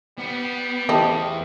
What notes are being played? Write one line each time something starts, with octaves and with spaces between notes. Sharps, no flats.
G3 B3
E2 A3 E4 G4 C5 D#5